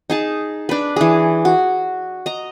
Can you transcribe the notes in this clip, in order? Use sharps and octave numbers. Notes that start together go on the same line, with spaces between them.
D#4 G#4 A5
D4 B4
E3 G#4
F#4
D#5 A#5